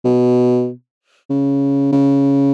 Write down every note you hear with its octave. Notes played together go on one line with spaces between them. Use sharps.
B2
C#3
C#3